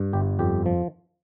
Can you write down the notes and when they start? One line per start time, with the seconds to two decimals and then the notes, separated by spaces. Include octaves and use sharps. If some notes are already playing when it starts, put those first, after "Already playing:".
Already playing: G2
0.13 G1 G4
0.39 F2 G4
0.66 F3